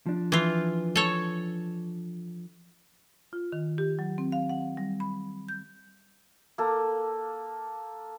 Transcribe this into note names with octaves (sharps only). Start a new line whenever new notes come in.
F3 D4
E3 F4
A4 C#5
F4
D#3
G4
F#3
C4
F5
F#5
G3
B5
G6
A#3 A4